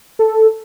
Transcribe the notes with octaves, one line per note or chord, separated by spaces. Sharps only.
A4